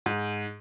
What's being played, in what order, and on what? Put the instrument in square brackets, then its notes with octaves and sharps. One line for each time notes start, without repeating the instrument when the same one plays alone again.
[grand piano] G#2